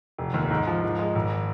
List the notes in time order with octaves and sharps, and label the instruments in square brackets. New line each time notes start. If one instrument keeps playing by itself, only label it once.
[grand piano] F1
D#2
G#2
F3
G#2
G#3
G#1